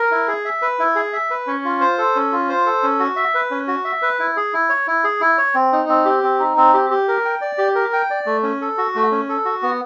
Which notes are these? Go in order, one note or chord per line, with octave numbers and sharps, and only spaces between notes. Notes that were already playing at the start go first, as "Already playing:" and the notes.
Already playing: A#4
E4
G#4
E5
B4
E4
G#4
E5
B4
C#4
F4
C5
A4
C#4
F4
C5
A4
C#4
F#4
E5
B4
C#4
F#4
E5
B4
E4
G#4
E4
C#5
E4
G#4
E4
C#5
C4
D#4
C4
G4
C4
D#4
C4
G4
G4
A#4
G5
D5
G4
A#4
G5
D5
A3
C#4
A4
F#4
A3
C#4
A4
F#4
B3